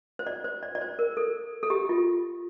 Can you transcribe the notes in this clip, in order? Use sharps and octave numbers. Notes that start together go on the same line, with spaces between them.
C5
D5
C5
D5
D5
C5
A#4
A4
A4
G4
F4